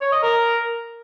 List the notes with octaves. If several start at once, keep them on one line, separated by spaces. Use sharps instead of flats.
C#5
D#5
A#4